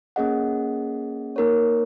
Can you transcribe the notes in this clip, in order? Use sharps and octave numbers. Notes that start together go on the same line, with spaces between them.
A#3 C#4 G#4 D#5 F#5
A#3 D#4 A#4 C#5